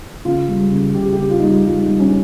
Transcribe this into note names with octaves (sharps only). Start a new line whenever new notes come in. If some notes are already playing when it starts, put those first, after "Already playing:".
C#3 F4
G3
C#3
C#3 G4
G4
C#3
F4
G3 D#4
F4
G3 F4
D#4
G3
C#4